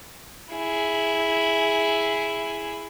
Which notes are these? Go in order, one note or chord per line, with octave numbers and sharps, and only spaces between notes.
E4 G#4